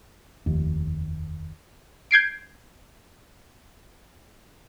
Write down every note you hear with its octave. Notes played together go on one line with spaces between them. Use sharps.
F1 D#2
G6 G#6 C7 D7